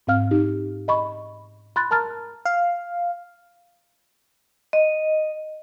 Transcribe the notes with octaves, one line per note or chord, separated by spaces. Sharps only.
G#2 C4 F5 F6
D#4 G4
D#5 B5 C#6
B5 C6 F#6 A6
A#4 A5 A#5 F6 A6
F5
D#5